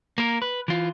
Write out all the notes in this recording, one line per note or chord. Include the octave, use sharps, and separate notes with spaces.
A#3 A#4
B4
E3 F4